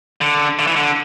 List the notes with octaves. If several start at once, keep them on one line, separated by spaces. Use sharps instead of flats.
D3
D3
E3
D3